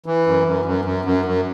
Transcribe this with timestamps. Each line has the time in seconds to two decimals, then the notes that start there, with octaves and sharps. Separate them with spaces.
0.06 E3
0.27 F#2
0.46 F#2
0.65 F#2
0.85 F#2
1.05 F#2
1.25 F#2